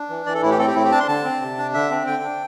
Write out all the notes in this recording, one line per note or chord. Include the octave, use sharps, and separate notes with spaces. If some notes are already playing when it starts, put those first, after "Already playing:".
Already playing: D4
E3
E3 D5
A4
A2 E4
G4
C4 A4
G4
A2 E4
G4
D4 A5
C6
D3 A5
C4
C3
D4
D3 E5
C4
D3 G5
D4